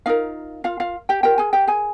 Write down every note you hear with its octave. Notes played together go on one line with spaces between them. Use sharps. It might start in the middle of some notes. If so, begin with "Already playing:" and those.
D#4 F4 A#4 F5
F4 F5
F4 F5
G4 G5
F4 G4 A#4 G5
G#4 G#5
G4 G5
G#4 G#5